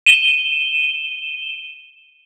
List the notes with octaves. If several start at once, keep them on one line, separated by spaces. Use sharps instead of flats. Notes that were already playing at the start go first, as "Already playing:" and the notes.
D#7 E7 G7